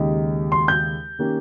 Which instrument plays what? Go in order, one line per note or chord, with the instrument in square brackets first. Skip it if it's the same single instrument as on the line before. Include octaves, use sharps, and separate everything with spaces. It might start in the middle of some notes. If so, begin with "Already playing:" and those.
Already playing: [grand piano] D#2 C#3 G#3 D#4 G4
[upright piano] C6
G6
[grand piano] D#3 A#3 C#4 G4